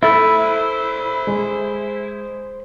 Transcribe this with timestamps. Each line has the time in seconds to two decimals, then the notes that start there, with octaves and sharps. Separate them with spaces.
0.03 E4 A4 C5 E5 B5
1.27 G#3